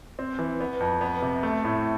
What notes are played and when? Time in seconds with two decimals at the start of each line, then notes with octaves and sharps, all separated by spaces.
0.19 C4
0.39 E3
0.60 B3
0.80 F2
1.01 B3
1.22 C3
1.43 A3
1.64 A2